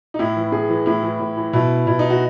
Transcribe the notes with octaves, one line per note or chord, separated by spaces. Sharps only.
D#4
A2 E4
E3
A2 G#4
E3
A2 E4
E3
A2
E3
B2 E4
B2 E4
D#4
F#4